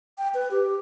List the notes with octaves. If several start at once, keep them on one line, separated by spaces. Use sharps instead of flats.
G5
B4
G4